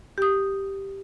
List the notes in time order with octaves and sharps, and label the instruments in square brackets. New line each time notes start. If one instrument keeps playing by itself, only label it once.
[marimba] G4 D#6